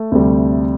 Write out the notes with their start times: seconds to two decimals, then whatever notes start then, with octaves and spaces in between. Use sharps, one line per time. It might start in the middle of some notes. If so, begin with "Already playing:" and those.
Already playing: A3
0.12 D2 C3 G3